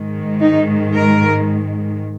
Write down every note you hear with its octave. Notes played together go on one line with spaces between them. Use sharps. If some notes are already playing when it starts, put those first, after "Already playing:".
Already playing: G#2 D#3 G#3
D#4
A#4